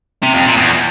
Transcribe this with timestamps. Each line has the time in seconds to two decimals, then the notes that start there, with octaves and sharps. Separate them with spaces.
0.23 C3
0.34 F2
0.46 A#2
0.57 E2